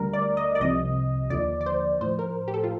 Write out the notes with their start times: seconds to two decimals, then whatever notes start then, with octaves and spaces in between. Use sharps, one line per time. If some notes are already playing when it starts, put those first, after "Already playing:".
Already playing: D2 D3 G3 A#4
0.13 D5
0.37 D#5
0.55 D5
0.60 C2 C3 F3 D#5
1.30 D#2 D3 F3 D5
1.61 D5
1.66 C5
2.01 A2 F3 C5
2.19 A#4
2.48 G4
2.54 A4
2.64 F4